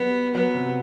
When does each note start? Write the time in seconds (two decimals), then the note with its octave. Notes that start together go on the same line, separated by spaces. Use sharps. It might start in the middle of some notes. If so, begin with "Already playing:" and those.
Already playing: F#3 G3 B3
0.34 F#3 B3
0.54 C3